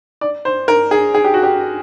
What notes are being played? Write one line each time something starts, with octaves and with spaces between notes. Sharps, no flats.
D5
C5
A#4
G#4
G#4
G4
F#4
G4